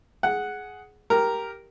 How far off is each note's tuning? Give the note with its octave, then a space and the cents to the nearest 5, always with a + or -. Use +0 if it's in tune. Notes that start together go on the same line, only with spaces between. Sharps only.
G#4 +10 F#5 +0
G4 +0 A#4 +0